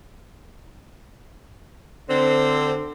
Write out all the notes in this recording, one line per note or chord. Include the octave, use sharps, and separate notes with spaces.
D3 C4